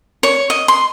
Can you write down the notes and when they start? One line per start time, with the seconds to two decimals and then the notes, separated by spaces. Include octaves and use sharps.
0.23 C#5
0.50 D#5
0.68 C6